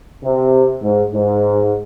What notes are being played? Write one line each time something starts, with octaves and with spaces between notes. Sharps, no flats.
C3
G#2
G#2